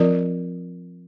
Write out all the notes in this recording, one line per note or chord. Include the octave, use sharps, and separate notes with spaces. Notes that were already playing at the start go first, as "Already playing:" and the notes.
Already playing: F3 C4 F4 A#4 D5